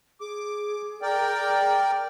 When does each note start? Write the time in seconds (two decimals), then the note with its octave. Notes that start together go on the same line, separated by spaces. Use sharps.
0.21 G#4 D6
1.02 A#4 D5 G5